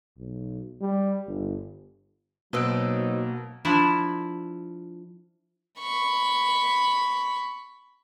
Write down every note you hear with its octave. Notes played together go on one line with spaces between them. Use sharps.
B1
G3
G1
B2 F#3 A#3 D#4 B4 C5 E6 D7
F3 D4 E4
B5 C#6